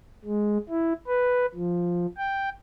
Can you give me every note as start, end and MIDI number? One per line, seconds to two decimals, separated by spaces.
0.24 0.57 56
0.69 0.93 64
1.07 1.46 71
1.55 2.06 53
2.17 2.49 79